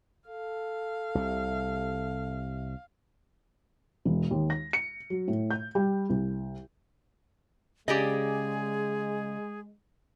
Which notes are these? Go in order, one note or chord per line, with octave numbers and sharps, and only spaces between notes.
A4 F5
C2 C3
E1
D#2
A#6
C#7
F#3
A2
G6
G3
C2
C#3 G#3 G4 G#4 D5 D#5